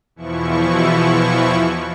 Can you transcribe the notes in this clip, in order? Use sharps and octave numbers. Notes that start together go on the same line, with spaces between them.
E2 B2 E3 F3 E4 C#6